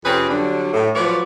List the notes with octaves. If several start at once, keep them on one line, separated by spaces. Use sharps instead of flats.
F2 C3 C4 C#4 G#4 B4
D3 F#3 G3 D4
A2
F3 F#3 F4 B4 C#5 D5